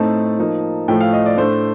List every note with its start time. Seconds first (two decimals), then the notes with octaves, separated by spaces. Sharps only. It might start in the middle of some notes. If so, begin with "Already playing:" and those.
Already playing: A2 A3 C4 D#4 A5
0.39 F3 A#3 D#4
0.88 A2 F3 A3 G5
1.01 F5
1.13 D#5
1.26 D5
1.38 A2 A3 D4 C5